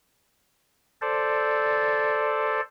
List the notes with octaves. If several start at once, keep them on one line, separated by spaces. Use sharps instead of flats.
A4 C5 D5